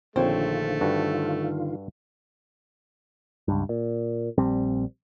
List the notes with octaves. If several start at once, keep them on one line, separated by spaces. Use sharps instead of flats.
A#1 D3 D#3 A3 C4 F4 C#5
G2 F#4 A4
C#2 G2
A#2
A#1 G3 C4